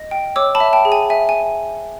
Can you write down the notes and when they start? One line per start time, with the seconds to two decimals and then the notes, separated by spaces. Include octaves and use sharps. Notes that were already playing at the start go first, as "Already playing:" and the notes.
Already playing: D#5
0.11 G5
0.36 C#5 D6 E6
0.55 A5 B5
0.60 E5
0.73 G5 A5
0.85 G#4
0.92 G#5
1.10 E5 G#5
1.29 G#5